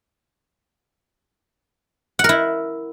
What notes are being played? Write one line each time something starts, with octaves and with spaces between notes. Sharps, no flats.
E4 A#4 F#5